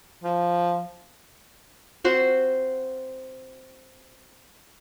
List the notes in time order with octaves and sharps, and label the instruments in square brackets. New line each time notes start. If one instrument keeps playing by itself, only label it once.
[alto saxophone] F3
[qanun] C4 F#4 C5